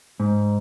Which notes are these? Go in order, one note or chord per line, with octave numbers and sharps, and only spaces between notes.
G#2